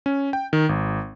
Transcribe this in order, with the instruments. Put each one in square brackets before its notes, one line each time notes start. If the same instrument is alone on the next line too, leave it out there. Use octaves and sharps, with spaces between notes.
[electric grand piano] C#4
G5
D#3
G#1